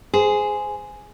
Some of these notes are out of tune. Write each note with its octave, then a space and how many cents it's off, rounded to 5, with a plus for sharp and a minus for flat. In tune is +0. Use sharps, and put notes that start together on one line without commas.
G#4 +5 C5 -20